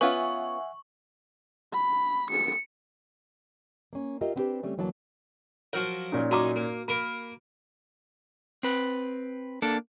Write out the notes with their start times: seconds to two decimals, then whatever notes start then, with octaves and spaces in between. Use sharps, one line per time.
0.01 B3 C#4 F4 E5 F#5 G#5 C#6
1.73 B5
2.31 C#7
3.93 A#3 C#4
4.21 F4 G4 A#4 D#5 E5
4.36 B3 C4 D4 F4 G4 B4
4.63 C#3 G3 A3 C4 C#4
4.77 D2 E3 F#3 A#3 D#5 A5
5.73 F3 F#3 A#4 C#5
6.12 A#2 C#4 D#4
6.31 F#2 F#4 C#5 D#5 A#5 D6
6.56 A#3
6.88 A#3 A#4 B5
8.63 C4 B4
9.62 A#3 D4 A4